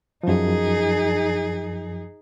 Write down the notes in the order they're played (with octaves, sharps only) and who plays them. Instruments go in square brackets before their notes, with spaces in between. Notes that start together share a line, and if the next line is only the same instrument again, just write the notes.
[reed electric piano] F#2 F3 [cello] D#4 G#4